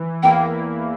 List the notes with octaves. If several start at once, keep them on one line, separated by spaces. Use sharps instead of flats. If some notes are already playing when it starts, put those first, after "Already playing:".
Already playing: E3
E2 E3 A#3 E4 G5